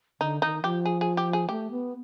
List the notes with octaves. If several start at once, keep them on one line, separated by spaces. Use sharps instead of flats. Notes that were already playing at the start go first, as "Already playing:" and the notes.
D3 D#4
D#3 D#4
F3 G4
G#4
G#4
G4
G#4
A3 G4
B3